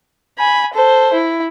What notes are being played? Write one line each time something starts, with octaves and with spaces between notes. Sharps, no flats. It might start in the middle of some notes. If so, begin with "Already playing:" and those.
G#5 B5
A4 C5
E4